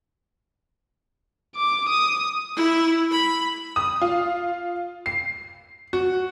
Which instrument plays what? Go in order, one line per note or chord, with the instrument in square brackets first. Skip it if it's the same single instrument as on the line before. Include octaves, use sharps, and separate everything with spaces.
[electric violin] D6
D#6
[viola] E4
B5
[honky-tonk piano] D#6
F4
C7
F#4